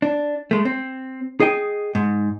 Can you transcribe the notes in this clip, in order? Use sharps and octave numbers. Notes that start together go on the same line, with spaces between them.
D4
G#3 A3
C4
G#4 D#5 G5
G#2